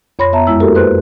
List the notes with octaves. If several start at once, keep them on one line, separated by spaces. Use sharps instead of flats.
F2 C#5 B5 C6 A#6
B3 E5 A5 A#5
F#2 G#3 E4 E6
A#3 F#4 G4 A4 A#4
B4 C5 C6 F#6